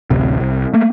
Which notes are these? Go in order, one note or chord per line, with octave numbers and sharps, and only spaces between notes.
A1 D2 C3
C2
A3 A#3